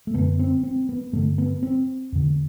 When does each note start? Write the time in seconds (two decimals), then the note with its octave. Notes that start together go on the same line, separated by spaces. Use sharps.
0.07 A3
0.14 F#2 D3 B3
0.39 C4
0.63 C4
0.89 B3
1.13 G2 D3 A3
1.38 B3
1.63 C4
2.12 E2 D3